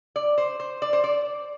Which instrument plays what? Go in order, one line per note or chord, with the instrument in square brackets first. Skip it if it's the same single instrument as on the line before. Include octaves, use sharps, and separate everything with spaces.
[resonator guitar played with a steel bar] D5
C5
C5
D5
C5
D5